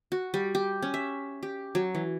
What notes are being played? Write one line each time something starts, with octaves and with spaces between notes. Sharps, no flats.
F#4
G3
G4
C#4
E5
G4
F#3
E3